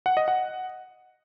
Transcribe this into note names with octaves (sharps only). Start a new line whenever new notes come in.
F#5
D#5
F#5